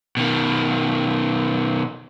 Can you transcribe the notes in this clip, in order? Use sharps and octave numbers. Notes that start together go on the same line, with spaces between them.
B2 D#3